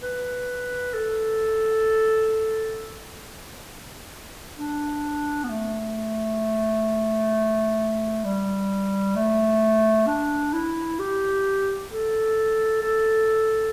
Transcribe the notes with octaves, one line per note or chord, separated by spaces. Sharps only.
B4
A4
D4
B3
A3
G3
A3
D4
E4
G4
A4
A4